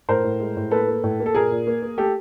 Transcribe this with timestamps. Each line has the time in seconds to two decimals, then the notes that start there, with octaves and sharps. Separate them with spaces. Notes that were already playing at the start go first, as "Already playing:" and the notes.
0.09 A2 A#4 C5
0.24 A2
0.40 G#3
0.57 A2
0.71 A#3 A4 B4
0.88 A#3
1.04 A2
1.20 A#3
1.26 A4
1.35 A#2 G#4 A#4
1.51 A#2
1.67 A#3
1.82 A#3
1.98 A3 G4 A4